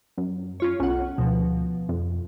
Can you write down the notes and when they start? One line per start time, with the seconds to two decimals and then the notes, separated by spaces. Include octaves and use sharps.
0.17 F#2
0.60 C#4 F4 C#5
0.80 B1 C#4 F#5
1.18 D2 B2 F3
1.89 F2